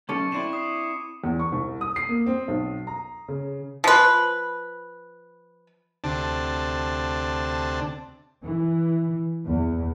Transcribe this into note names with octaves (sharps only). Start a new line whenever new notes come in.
B1 C#4 A4 C#6 D6 C#7
C4 D4 E4 E7
D#6 C7
E2
C#6
C2
D#6
C7
A#3
C4
B1
A#5
C#3
F3 B4
D2 C3 D4 A5
E3
E2